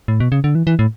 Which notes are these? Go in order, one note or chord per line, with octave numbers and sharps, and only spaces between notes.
A2
B2
C#3
D3
E3
E3
A2